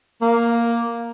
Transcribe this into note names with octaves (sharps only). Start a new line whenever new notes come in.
A#3